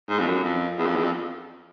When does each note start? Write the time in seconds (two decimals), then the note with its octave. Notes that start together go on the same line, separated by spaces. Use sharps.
0.09 G#2
0.19 F2
0.27 F#2
0.44 F2
0.78 E2
0.86 F2
0.96 E2
1.04 F2